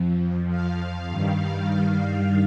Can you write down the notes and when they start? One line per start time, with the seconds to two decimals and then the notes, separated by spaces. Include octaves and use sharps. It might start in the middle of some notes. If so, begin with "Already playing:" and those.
Already playing: F2 F3
0.49 F5
1.09 G2 D#3 G3 F5
1.38 F5